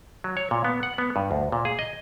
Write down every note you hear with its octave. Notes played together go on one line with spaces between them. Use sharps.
F#3
C#5
A#2
B3
F#5
B3
G2
D2
A#2
G#4
D#5